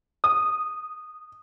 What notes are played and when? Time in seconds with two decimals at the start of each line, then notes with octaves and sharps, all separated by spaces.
0.24 D#6